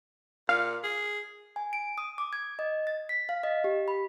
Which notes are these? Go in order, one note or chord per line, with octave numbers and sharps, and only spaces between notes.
A#2 F5
G#4
G#5
D7
D#6
D6
G#6
D#5
A6
B6
F5
D#5
G4
B5